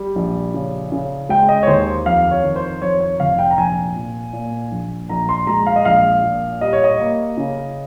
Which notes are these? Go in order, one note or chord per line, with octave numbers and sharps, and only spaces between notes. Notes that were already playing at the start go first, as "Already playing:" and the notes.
Already playing: G3
A#1
C#3
C#3
G#3 G5
D#5
C#5
D#2 C5
F2 F5
C#5
D#3
C5
F2 C#5
C#5
F1 F5
G5
A#5
A#1 G#5
A#2
A#2
A#1
A#1 A#5
C6
G#3 A#5
F5
D#5
A#1 F5
A#2
G3 D#5
C#5
D#5
A#3
C#3